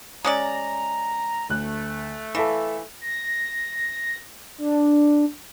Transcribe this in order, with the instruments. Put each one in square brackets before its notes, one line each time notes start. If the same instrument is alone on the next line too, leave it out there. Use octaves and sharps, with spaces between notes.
[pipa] G#3 C#4 D5 [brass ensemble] A#5
[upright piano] D2 F#6 [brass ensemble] A3
[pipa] E3 [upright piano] A4 E5 F5
[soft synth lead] A#6
D4